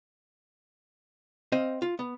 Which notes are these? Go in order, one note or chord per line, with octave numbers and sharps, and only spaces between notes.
C4 C5 D#5 F5
F4
B3